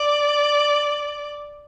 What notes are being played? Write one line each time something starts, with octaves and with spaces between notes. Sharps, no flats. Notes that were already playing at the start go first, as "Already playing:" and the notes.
Already playing: D5